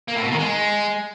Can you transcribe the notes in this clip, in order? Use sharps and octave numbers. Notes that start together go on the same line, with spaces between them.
A#3
A2
B2
D#3
G#3